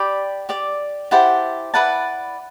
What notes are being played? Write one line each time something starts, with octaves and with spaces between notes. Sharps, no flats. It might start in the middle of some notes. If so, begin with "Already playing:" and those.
Already playing: G4 D5 G5 B5
G4 D5
E4 G4 C5 F#5 A5
E4 B4 D5 F#5 A5